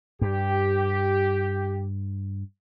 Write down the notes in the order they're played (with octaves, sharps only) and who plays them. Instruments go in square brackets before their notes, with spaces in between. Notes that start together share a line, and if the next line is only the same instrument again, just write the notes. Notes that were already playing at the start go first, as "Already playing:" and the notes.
[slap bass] G2 [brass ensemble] G4